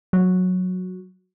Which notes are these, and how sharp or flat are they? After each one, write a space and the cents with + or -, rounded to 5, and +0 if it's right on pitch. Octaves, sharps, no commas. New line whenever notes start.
F#3 -15